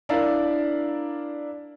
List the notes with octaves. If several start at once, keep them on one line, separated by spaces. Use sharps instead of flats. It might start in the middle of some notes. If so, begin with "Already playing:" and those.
D4 E4 A#4 D5 F5